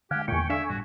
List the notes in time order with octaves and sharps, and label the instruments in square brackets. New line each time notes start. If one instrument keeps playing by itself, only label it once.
[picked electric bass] D3 G#3 [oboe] G4 [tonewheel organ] F5 F#5 G#5
[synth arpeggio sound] E2 A#2 [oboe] G5 [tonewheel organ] G#5 C#6
[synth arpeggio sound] D4 A4 F5 [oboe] E5
[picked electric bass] G1 A2 G3 [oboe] F#4